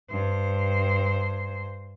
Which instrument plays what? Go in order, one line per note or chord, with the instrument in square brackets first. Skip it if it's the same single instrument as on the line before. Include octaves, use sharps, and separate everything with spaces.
[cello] G2 C5